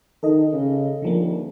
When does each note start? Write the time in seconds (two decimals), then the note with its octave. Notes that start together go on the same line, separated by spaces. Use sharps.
0.23 D#3 A4 D#5
0.53 C#3
1.02 D#1 D3 F3 A#3